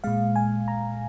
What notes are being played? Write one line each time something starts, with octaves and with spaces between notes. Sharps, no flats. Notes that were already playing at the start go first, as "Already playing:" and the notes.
A#2 G#3 F5
G#5
A#5